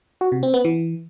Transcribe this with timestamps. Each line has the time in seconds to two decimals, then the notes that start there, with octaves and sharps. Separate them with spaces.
0.21 F#4
0.32 C3
0.43 C4
0.54 B3
0.65 E3